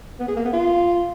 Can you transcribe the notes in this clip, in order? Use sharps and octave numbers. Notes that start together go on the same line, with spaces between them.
B3
G#4
A#3
B3
F4